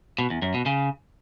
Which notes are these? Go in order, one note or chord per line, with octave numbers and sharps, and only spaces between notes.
B2
E2
F#2
B2
C#3